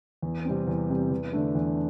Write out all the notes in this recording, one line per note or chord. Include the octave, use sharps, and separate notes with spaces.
E2
C3 G3 C4
E2
C3 G3 C4
E2
D3 A3 D4
E2